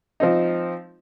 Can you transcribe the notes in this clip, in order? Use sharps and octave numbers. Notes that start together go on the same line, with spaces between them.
F3 C4 D#4